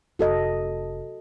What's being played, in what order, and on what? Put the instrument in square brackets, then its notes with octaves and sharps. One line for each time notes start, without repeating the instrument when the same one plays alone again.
[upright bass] F1 [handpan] F#4 A4 D#5